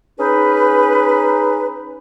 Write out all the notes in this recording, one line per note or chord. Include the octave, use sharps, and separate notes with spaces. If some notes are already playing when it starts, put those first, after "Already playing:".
C#4 D#4 G#4 B4